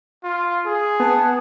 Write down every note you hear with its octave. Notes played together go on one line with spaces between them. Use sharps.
F4
G#4
B3 A5